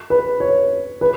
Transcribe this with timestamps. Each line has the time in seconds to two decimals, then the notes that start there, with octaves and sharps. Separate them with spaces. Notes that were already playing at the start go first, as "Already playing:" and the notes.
0.10 B4
0.40 C#5
1.01 B4